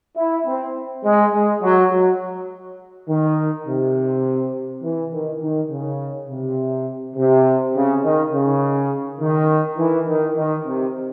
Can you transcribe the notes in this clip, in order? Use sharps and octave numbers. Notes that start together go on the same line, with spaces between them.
E4
C4
G#3
G#3
F#3
F#3
D#3
C3
E3
D#3
D#3
C#3
C3
C3
C#3
D#3
C#3
D#3
E3
D#3
D#3
C3